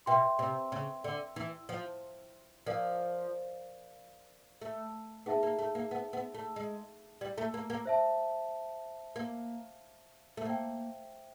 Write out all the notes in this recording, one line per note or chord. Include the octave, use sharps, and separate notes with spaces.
B2 B4 E5 G5 C6
C3
C#3
D3
E3
F3
F3 A#4 D5 F5
A3
B3 D#4 G#4 B4 E5 A5
A#3
A3
A#3
B3
B3
A3
G#3
G3
A3
A#3
A#3
C5 E5 A5
A#3
A3
A#3 C5 E5 G5